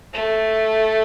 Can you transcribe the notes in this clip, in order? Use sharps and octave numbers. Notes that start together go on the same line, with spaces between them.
A3